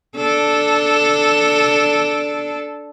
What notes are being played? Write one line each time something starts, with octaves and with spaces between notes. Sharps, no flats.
D4 A4